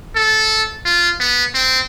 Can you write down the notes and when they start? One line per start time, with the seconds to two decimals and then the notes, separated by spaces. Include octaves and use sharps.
0.15 A4
0.85 F4
1.19 B3
1.55 C4